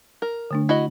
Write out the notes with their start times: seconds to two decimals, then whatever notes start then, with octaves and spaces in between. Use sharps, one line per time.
0.22 A#4
0.51 D3 A3 D4
0.69 E4 F#4 D#5